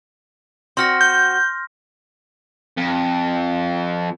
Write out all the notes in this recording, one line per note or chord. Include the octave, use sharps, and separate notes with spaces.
C4 F#4 C6 F6 A#6
G6
F2